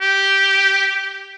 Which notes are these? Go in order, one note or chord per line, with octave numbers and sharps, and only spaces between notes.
G4